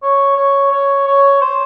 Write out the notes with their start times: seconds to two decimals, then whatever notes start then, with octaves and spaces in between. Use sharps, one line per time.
0.03 C#5
0.37 C#5
0.71 C#5
1.07 C#5
1.41 C5